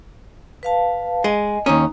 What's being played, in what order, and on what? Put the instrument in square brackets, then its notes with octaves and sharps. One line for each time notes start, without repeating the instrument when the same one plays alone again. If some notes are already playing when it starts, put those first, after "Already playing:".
[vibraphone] B4 F5 A5
[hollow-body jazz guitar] G#3 [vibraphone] D#5 G#5
[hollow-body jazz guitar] D#2 C#4 [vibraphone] D#4 A#5 D#6